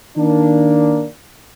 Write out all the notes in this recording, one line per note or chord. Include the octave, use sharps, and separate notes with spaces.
D#3 A#3 D4